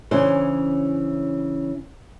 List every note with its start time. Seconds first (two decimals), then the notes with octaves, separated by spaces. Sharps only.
0.11 C#3 E3 C#4 D4 C5